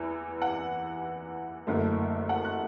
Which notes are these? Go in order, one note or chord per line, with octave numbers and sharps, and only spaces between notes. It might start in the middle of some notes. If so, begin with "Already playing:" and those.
Already playing: E2 E3
F#5
F#1 F#2 D3 A3
F#5
F#6